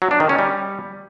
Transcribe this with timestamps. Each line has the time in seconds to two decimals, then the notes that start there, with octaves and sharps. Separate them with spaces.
0.02 F#3
0.11 D4
0.20 D#3
0.29 C#4
0.39 G3